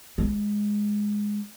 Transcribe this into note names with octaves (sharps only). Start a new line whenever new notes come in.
G#3